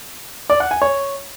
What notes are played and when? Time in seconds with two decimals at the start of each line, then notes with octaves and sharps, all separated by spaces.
0.50 D5
0.60 F#5
0.71 G#5
0.82 C#5